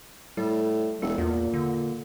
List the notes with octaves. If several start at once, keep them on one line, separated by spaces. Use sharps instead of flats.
A2 G3
E1 A4
E2 A#2
D3